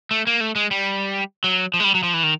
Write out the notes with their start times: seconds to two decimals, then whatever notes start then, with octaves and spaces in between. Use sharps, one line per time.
0.11 A3
0.27 A#3
0.40 A3
0.56 G#3
0.71 G3
1.44 F#3
1.74 F3
1.80 G#3
1.84 G3
1.95 F#3
2.03 F3
2.14 E3
2.23 D#3